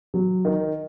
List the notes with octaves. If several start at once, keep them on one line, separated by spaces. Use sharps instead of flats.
F#3
D#3